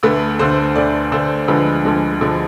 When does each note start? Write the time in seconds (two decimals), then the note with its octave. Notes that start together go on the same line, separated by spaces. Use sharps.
0.03 D2 D3 A3 B4
0.39 D2 D3 A3 C5
0.75 D2 D3 A3 D5
1.12 D2 D3 A3 C5
1.48 D2 D3 F3 G#3 B4
1.85 D2 D3 F3 G#3
2.21 D2 D3 F3 G#3